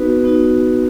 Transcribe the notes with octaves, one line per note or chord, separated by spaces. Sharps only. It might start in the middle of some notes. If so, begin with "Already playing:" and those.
Already playing: B3 D#4 F#4 B4
B3 D#4 F#4